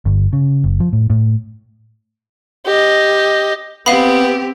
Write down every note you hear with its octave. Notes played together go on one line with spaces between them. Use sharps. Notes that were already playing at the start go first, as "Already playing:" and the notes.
G1
C#3
F#1
F3
A2
A2
G4 D#5
B3 C4 G4 F5 B5